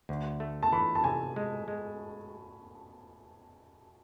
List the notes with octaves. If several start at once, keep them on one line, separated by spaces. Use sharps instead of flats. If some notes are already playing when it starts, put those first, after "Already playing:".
D2
A3
A5
E3 B5
A5
C3 G#5
G#3
G#3